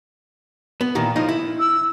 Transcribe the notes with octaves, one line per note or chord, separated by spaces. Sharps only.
B3
A#2 D#3 E3
A2 F3 D#4
E4
E6